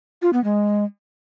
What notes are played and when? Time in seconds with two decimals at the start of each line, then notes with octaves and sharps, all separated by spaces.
0.22 F4
0.33 B3
0.44 G#3